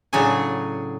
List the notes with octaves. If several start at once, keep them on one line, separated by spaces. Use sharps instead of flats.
A2 C#3 F#3 D4 G#4 G#5